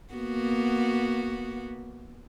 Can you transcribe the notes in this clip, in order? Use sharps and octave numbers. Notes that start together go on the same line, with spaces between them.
A#3 B3 F#4